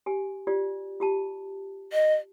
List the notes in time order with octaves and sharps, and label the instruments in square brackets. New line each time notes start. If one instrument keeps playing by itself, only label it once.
[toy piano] G4 G#5
F4 G4 D5
F4 G4 A5
[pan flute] D#5